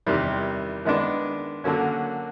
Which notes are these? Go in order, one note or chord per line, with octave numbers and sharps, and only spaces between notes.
E2 C3 D#3 G3
D#3 G#3 B3 D4
D3 F#3 A#3 C#4